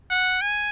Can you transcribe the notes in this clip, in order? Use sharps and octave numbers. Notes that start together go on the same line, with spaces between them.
F#5
G#5